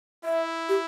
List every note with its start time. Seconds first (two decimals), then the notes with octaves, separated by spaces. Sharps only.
0.24 E4 E5
0.69 G4